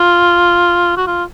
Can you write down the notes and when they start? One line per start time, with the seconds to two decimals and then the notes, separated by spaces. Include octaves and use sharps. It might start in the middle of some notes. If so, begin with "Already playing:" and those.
Already playing: F4
0.97 F#4
1.07 F4